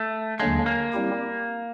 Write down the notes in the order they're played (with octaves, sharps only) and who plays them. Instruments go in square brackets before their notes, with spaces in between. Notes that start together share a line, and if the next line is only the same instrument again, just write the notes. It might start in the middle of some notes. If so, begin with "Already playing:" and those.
Already playing: [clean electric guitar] A3
[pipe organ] D#2 D3 F#3 A#3 D4 [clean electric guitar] G#3
[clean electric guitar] A#3
[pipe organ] G3 C4 E4 G4